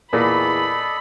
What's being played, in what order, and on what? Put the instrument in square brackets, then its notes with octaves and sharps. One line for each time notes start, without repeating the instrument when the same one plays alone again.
[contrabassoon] E2 [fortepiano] A#2 [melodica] A4 D5 D#5 [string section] B5